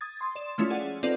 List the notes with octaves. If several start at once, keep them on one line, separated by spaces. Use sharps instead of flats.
D#6 G#6 A6
C6 D#6
D5 E7
F3 G#3 A3 C#4 E4 F4
G#4 D5 F#5
C4 D#4 F4 A4 B4 D5